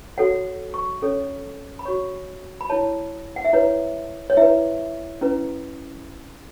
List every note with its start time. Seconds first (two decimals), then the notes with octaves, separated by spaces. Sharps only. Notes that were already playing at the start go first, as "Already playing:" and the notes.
0.18 F#4 A4 C#5 F#5
0.74 C#6
1.02 C#4 A4 C#5
1.79 B5
1.85 F#4 C#5 C#6
2.61 B5
2.69 E4 C#5 A5
3.36 F#5
3.45 E5
3.53 E4 B4 C#5
4.30 C#5
4.37 E4 B4 E5
5.21 C#4 E4 B4